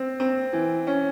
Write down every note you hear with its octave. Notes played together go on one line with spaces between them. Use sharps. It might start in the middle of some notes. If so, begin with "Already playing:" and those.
Already playing: C4
C4
E3
C#4